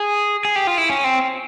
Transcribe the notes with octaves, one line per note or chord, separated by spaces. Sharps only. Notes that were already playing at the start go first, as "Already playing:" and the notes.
Already playing: G#4
G#4
G4
F4
E4
C#4
C4